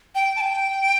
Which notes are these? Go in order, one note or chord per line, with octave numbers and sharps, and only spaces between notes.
G5
A5
G5